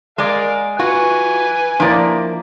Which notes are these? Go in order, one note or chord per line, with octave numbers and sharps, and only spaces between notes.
G#3 A#4 D5 F5
F4 F#4 B4 F#5 G#5
F3 A#3 D4 E4 D5